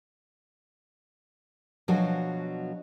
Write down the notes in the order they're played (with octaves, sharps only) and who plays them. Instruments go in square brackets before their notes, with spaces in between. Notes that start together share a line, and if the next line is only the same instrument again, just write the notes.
[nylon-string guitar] B2 F3 F#3 D4 F#4 G#5